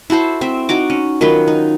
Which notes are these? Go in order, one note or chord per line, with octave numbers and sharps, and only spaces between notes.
E4 F#4 A4 C5
C4 E5
D#4 F#4 A#5 D6
C#4
D#3 F#3 F4 B4
D#4